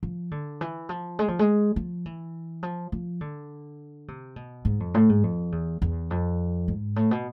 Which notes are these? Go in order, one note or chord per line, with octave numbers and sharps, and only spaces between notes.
F3
D3
E3
F3
G#3
F3
G#3
F3
E3
F3
F3
D3
C3
B2
G#2
F2
A2
G#2
F2
E2
E2
F2
G#2
A2
B2